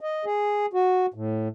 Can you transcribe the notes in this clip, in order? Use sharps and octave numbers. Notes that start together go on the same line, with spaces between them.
D#5
G#4
F#4
A2